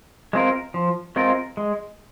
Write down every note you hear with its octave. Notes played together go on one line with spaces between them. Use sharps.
G#3 C4 F4 A#4
F3
G#3 C4 F4 A#4
G#3